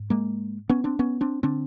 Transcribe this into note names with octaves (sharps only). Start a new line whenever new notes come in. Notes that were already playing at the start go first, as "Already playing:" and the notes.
Already playing: G#2
G#3 A#3
B3 C#4
C4 D4
B3 C#4
C4 D4
D3 C4 D4